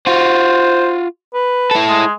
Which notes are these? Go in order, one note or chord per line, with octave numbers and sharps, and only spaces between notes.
F4 F#4 C5
B4
E4 A4
G#3